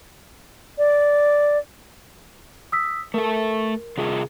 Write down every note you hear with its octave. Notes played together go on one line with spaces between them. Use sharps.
D5
D#6 E6 B6
A3 A4 A#4
C3 F4 G#4